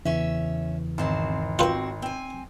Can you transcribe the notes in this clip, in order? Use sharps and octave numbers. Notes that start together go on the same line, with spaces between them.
E2 C#3 E3 C#4 E5
G#1 F#2 C4 A5
C4 F4 F#4 B4
C4 G#5